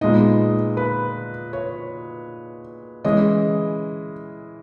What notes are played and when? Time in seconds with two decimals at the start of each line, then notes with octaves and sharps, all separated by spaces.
0.01 A#2 G#3 B3 D#4 D#5
0.77 B4
1.53 C#5
3.04 E3 G#3 C#4 E4 D#5